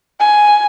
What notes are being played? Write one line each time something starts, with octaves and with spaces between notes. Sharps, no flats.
G#5